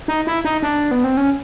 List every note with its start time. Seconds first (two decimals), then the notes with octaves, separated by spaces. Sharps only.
0.08 D#4
0.27 E4
0.45 D#4
0.62 D4
0.91 B3
1.04 C4
1.17 C#4